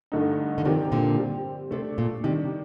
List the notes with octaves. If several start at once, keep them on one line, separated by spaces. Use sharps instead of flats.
G2 D3 A3 D#4
D3
C3 D#3 F3 C4 G4 A#4 D5
A#2 D3
G3 C4 G4
C3 A3 D4 A4 D5
A#2
C3 D#3 G3 D4